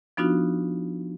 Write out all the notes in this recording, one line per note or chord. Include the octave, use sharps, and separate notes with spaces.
F3 B3 D4 D#4 F4 F#4